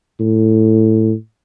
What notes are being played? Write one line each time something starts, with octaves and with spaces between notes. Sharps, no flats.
A2